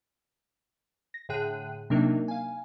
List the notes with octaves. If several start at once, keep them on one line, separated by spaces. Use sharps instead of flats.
A#6
A2 D3 G#4 G5 F#6 D#7
C3 F#3 A#3 D4 D#4 A#4
F5 G#5